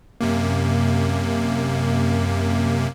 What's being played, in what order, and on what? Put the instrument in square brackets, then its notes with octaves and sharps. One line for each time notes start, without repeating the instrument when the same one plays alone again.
[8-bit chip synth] F#2 C3 A#3